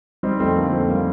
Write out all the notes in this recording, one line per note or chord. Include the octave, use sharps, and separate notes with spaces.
G3 C4 D#4
F2 A3 C4
D3 A#3
F2 A3 C4
G3 A#3